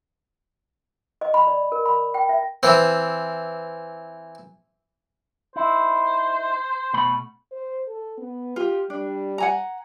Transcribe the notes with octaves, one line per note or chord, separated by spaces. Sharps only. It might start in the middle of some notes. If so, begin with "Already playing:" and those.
D#5
B5
D5
A#4
B5
G5
E5
E3 C4
D#4 E4 C5
B2 A3 B5
C5
A4
B3
F4 G4
G3 D4
F#5 G#5 A#5